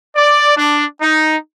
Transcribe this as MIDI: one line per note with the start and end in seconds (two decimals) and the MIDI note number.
0.16 0.55 74
0.57 0.84 62
1.02 1.36 63